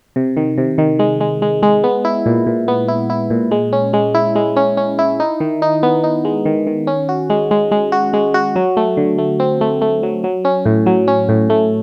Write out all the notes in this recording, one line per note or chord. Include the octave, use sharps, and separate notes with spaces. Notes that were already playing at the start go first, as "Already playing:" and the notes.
C3
D#3
C3
D#3
G#3
G#3
G#3
G#3
B3
E4
A#2
A#2
B3
E4
E4
A#2
G#3
C#4
G#3
E4
G#3
C#4
C#4
E4
D#4
D#3
D#4
B3
D#4
G#3
D#3
D#3
C#4
F#4
G#3
G#3
G#3
F#4
G#3
F#4
F#3
A3
D3
A3
C4
A3
A3
F#3
F#3
C#4
A2
F#3
C#4
A2
A3